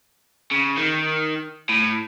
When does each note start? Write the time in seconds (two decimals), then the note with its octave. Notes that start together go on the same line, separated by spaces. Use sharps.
0.51 C#3
0.77 D#3
1.69 A2